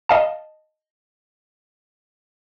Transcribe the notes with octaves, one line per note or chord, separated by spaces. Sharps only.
D#5 F5 A5